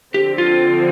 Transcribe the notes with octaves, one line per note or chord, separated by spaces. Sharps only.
D3 F3 C4 G4
F4